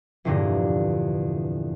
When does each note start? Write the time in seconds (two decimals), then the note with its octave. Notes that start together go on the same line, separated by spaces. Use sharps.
0.25 F1 E2 G2 A#2 D3 A#6